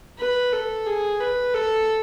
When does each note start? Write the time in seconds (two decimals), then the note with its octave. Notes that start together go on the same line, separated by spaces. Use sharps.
0.19 B4
0.53 A4
0.86 G#4
1.21 B4
1.54 A4